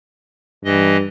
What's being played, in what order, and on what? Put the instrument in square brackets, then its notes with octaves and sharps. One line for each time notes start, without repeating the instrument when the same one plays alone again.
[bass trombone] G2 [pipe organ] E3 D#5